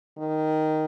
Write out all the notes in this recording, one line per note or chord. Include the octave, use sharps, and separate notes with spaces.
D#3